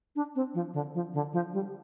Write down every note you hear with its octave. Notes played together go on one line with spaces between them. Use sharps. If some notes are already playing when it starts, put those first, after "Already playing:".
D4
C4
F3
D3
F3
D3
F3
G3